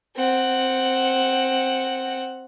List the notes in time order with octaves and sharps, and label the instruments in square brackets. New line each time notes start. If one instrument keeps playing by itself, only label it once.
[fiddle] C4 F#5